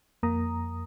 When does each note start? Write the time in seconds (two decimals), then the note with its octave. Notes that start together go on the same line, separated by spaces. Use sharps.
0.23 F2 A#3 A#5 D#6